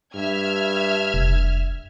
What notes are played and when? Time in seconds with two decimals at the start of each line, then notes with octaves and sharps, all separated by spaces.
0.15 G2 E5 F6 G#6
1.14 F1